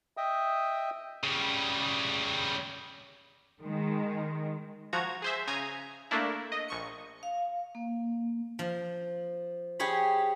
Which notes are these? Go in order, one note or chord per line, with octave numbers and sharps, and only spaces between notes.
D#5 E5 G5 D#6
C#3 G3
D#3 G#3
F3 F#4 A#5 G#6
G#4 C5 E5
C#3 G#5 A#5 D#6 G#6
A3 A#3 D4 E4
D#5
A#1 C#6 C#7
F5
A#3
F3
G4 G#4 C#5 B5